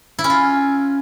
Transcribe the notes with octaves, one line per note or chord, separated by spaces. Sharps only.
E4
C#4
F4